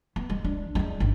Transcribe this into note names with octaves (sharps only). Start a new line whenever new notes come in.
B3
G#3
D4
G#3 D4
G#1